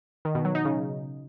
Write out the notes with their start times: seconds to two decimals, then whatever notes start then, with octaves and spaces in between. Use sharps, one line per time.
0.25 D#3
0.35 B2
0.45 F#3
0.55 D#4
0.65 C#3